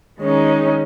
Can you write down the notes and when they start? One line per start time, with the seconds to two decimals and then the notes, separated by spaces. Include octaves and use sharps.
0.19 D#3 G#3 C#4 D#4